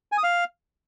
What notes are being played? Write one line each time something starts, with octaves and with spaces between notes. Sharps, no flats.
G#5
D#6
F5